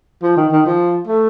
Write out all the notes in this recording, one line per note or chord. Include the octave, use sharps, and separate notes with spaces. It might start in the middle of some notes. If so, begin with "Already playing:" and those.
F3
D#3
D#3
F3
A3